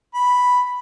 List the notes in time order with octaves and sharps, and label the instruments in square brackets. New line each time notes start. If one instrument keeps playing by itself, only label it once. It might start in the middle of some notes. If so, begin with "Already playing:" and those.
[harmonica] B5